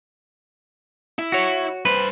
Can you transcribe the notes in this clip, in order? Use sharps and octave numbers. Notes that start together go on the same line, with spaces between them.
E4
F#4 C#5
G2 B4 C5